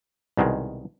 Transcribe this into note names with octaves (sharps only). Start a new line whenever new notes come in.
C2 B2 D#3 G#3